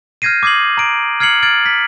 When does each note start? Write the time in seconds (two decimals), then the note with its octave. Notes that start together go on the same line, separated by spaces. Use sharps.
0.22 F6 G6 G#6 A#6 C7 D#7
0.43 D6 D#6 G#6 C7 F#7
0.77 A#5 D7
1.20 F6 G#6 C7 C#7 F#7
1.42 F6 G#6 A6 D7 F#7
1.66 B6